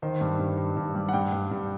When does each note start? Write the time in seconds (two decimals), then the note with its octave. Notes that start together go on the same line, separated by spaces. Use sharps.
0.02 D#3 C5
0.21 G2
0.39 G2
0.58 G2
0.76 G2
0.95 G3
1.09 F#5
1.13 G2 G5
1.32 G2
1.51 G2